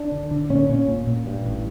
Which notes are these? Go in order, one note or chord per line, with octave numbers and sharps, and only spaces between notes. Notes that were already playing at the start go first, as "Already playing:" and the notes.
Already playing: D4
D3
D3
A#2 C#4
A#2 C#4
A#2
A#2
G2
A1